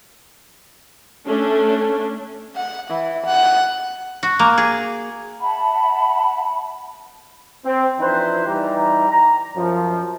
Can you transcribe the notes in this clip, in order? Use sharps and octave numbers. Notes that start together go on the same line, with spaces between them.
A3 C#4 D4
F#5
E3
F#5
F#4
A#3
G#4
E5 F#5 A5 B5
C4
E3 F3 D4 D#4 B4 C5
E3 G3 D#4 G4 A#5
A#5
F#2 F3